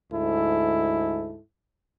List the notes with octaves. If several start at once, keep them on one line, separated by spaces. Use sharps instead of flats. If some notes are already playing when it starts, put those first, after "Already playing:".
D2 G#2 E4 A4